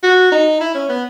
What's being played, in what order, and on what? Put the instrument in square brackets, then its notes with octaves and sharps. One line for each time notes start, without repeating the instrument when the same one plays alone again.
[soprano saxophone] F#4
D#4
E4
C#4
B3